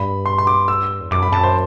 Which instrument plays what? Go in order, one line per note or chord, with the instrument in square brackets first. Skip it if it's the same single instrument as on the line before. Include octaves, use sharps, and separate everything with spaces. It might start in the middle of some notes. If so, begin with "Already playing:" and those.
Already playing: [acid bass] G2 [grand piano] B5
[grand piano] C6
C6
D6
E6
[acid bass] E2
[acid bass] F#2 [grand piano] D6
[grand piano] B5
[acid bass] F#2 [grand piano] A5
[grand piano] C5